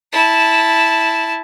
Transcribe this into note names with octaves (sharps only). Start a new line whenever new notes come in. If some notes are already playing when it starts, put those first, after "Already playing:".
E4 A5